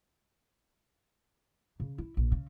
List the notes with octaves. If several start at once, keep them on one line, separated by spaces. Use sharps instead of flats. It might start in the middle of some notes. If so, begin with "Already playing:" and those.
C#3
E4
A#1
C#3